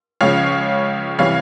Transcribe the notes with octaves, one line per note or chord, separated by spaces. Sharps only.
C#2 C#3 F3 C#5 F5
C3 E3 G3 C#5 F5